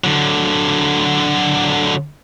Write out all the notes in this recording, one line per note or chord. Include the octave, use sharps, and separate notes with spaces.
D3 F#3